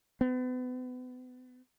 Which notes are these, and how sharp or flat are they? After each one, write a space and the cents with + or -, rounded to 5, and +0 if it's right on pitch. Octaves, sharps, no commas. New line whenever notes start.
B3 +35